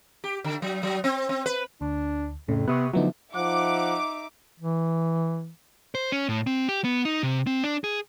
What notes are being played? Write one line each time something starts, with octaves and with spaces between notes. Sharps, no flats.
G4
D3
F#3
F#3
C4
C4
B4
D2 D4
F2 A2 C#3
C3 B3 C#6 D#6 F#6
D3 F3 F#3 A3 B3 D#4
F3 D#4 E5 F#5 D6
E3
C5
C#4
A2
C4
G4
B3
D#4
C3
C4
D4
G#4